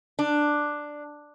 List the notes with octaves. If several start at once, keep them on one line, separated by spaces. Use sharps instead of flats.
D4